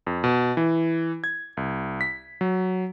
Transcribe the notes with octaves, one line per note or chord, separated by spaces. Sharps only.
F2
B2
E3
G#6
C2
B6
F#3